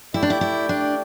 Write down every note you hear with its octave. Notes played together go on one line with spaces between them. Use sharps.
A3 E4 G4 D5 G5
D4
E4
E4
D4